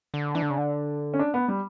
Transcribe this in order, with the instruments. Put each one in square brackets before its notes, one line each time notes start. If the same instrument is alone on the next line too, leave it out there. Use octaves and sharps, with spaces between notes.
[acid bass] D3
[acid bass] E3 [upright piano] D4
[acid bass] D3
C#3
D3
[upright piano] C#4
D4
B3
G3